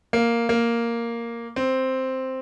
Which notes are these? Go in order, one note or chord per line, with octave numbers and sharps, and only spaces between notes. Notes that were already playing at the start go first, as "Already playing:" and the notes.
A#3
A#3
C4